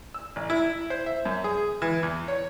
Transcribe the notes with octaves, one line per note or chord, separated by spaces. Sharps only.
E6
A1
E4
C5
E5
F#2
G#4
E3
E2
C#5